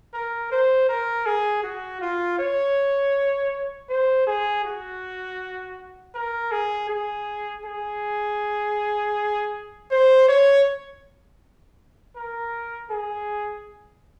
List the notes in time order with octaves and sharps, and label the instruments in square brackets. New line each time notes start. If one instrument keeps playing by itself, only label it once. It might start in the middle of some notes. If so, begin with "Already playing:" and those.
[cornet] A#4
C5
A#4
G#4
F#4
F4
C#5
C5
G#4
F#4
A#4
G#4
G#4
G#4
C5
C#5
A#4
G#4